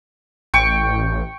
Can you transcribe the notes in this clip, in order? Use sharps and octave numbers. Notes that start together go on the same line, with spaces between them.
A1 G5 C#6